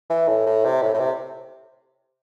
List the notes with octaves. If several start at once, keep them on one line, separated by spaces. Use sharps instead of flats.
E3
A2
A2
C3
A2
A2
C3